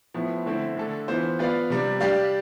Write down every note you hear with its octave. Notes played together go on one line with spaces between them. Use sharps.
A2 F3 B3
D3 A3 C4 E4
D3 A3 D4 A4
E3 B3 F4 C5
B3 F4 B4 D5 F5
C3 G3 D4
G3 D4 G4 D5 F5